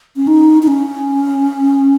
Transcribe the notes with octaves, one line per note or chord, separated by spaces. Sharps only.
C#4
D#4
D#4
C#4